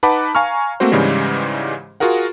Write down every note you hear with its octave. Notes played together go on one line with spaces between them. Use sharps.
D#4 B4 F#5 A5 B5 D6
F5 G#5 A#5 C#6 F6
A3 A#3 C4 F#4 C5
G#2 C#3 E3 G3 G#3
F4 F#4 G#4 A#4 F#5